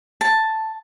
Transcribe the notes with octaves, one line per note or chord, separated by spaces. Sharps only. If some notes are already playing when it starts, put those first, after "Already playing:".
A5